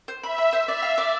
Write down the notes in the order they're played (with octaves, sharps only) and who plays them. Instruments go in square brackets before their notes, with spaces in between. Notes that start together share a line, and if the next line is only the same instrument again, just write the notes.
[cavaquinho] C5
[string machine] E5 [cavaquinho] B5
[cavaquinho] B5
C5
[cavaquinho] D5 [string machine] E5
[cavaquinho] F5
D5